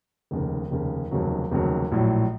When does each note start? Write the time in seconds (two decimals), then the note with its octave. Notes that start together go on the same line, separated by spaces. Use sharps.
0.31 F1 D#2 C#3
0.71 F1 D#2 C#3
1.11 F1 D#2 C#3 F#3
1.51 F1 D#2 C#3 F#3
1.92 A#1 A2 F#3